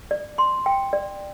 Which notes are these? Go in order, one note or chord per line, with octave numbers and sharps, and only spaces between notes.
D5
C6
G5
D5